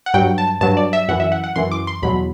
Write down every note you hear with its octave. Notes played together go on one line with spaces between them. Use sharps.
F#5
G2 F#3 G5
A5
G2 F#3 A5
D5
E5
F#2 E3 F#5
E5
F#5
F#5
F#2 E3 C6
D6
C6
E2 B2 F#3 B5